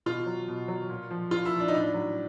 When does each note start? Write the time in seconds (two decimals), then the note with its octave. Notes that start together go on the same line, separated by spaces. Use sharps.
0.06 B2 F4
0.26 F#3
0.48 B2
0.68 F#3
0.90 A#2
1.10 F3
1.31 A#2 F4
1.45 E4
1.52 F3
1.60 D4
1.68 D#4
1.73 A2 D4
1.94 F#3